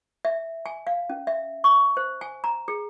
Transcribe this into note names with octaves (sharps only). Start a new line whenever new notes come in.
E5
G#5
F5
C#4
E5
C#6
C5
G#5
A#5
G#4